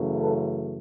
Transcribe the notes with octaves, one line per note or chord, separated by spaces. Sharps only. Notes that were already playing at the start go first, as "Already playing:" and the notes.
Already playing: F#2 C#3 E3 A3
A4 B4